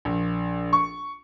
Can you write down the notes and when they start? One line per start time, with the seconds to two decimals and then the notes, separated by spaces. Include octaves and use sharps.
0.05 A#1
0.73 C#6